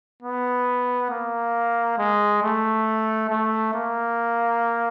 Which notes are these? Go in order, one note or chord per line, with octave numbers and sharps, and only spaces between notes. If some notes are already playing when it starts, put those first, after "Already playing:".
B3
A#3
G#3
A3
A3
A#3